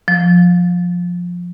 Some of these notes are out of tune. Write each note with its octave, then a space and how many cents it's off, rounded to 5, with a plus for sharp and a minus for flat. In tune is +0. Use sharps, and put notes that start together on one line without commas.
F3 +15